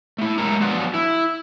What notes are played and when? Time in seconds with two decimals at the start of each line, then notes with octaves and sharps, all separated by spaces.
0.18 A3 E4
0.38 F#3 G#3 A3 A4 A#4 A#5
0.61 F3 F#3 B3 D4 F4 F#4
0.94 E4